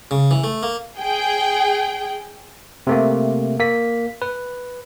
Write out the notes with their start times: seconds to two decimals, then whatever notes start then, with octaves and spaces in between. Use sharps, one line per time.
0.11 C#3
0.31 E3
0.44 A3
0.63 A#3
0.98 G#4 G5
2.87 C3 A3 A#3
3.59 A#3 B6
4.22 B4